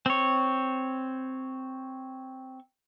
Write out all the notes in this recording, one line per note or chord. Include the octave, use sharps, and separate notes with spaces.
C4 C#5